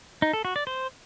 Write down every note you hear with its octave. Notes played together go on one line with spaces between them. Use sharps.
D#4
A4
F#4
D5
C5